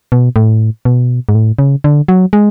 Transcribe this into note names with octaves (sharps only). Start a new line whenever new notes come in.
B2
A2
B2
G#2
A2
C#3
D3
F#3
G#3